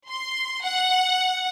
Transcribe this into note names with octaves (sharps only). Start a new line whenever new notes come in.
C6
F#5